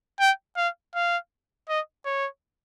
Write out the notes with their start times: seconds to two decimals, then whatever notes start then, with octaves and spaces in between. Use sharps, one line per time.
0.20 G5
0.57 F5
0.95 F5
1.69 D#5
2.05 C#5